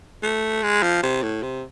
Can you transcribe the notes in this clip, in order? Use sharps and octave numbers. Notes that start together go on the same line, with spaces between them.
A3
G#3
F3
C3
A2
C3